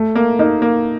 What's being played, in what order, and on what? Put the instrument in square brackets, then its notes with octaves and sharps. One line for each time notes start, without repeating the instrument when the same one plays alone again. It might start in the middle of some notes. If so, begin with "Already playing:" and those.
Already playing: [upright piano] A3
[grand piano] A#3
[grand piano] A#3 [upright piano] D#4
[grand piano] A#3